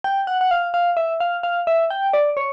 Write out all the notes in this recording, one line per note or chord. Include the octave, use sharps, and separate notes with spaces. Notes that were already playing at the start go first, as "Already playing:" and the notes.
G5
F#5
F#5
F5
F5
E5
F5
F5
E5
G5
D5
C#5